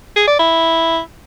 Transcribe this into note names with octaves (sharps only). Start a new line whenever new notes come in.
G#4
D5
E4